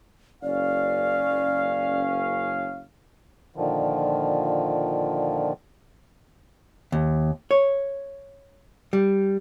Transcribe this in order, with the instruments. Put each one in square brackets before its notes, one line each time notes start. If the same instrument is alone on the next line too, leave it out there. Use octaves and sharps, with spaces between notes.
[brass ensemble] F#1 C#4 F5 [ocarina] D5
[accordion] A#2 D3 D#3 F3
[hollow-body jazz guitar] D#2
C#5
G3